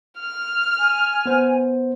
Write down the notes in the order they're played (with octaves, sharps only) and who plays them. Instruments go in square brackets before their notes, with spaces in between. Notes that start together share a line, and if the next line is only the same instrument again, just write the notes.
[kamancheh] F6
[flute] G#5
[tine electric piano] B3 C5